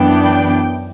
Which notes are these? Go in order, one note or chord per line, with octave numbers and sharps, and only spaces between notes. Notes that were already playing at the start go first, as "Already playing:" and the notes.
Already playing: F#2 E3 B3 D4 G5